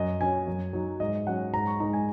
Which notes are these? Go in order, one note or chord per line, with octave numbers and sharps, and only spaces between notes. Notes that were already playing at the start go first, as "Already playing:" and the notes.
Already playing: F#2 D#5
F#3 C#4 G#5
F#2
F#3 D#4
G#2 D#5
F#3 C#4 F#5
G#2 A#5
C#6
G#3 D#4 A#5
G#5